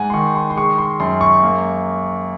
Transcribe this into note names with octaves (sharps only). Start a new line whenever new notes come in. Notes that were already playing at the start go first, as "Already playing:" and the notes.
Already playing: G#2 F#5 G#5
C6
D#3 C#6
C6
C6
G#3 C#6
C6
F#2 C6
C#6
A#3